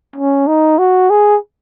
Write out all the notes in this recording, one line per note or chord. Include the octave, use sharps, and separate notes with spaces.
C#4
D#4
F#4
G#4